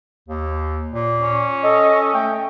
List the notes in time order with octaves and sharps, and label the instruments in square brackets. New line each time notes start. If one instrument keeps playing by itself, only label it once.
[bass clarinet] D#2
A#2
[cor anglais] C#4
[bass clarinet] A4 [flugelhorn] D#5
[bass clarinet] A3 [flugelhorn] G5